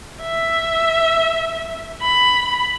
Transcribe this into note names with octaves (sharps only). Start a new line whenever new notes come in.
E5
B5